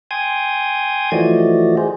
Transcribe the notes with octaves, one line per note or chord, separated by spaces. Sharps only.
G5 G#5 C6 D#6 G#6
E3 F3 A3 F#4 D5 D#5
G#4 C5